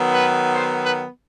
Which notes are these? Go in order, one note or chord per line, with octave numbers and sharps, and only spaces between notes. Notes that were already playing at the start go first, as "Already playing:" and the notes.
Already playing: D#3 F#3 B3
B4
C5
B4